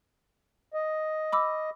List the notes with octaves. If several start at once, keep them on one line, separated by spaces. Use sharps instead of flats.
D#5
B5 D6 E6